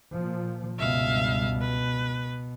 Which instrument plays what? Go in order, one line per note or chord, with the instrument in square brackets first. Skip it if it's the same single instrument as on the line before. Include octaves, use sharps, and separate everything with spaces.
[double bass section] A#2 F3
[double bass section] C#2 G2 [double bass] B2 [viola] E5 F5
[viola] B4